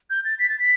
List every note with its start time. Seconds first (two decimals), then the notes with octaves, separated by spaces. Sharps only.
0.10 G6
0.25 A6
0.39 B6
0.50 A6
0.59 B6